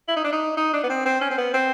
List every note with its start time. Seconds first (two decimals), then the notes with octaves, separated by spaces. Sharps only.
0.08 E4
0.16 D#4
0.24 D4
0.32 D#4
0.57 D#4
0.73 D4
0.83 B3
0.89 C4
1.05 C4
1.21 C#4
1.31 C4
1.38 B3
1.54 C4